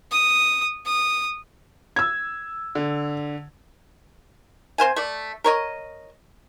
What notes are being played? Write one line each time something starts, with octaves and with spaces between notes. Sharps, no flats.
D#6
D#6
E6 G#6
D3
C4 C5 F5 G#5
A3 D5
A#4 C#5 D#5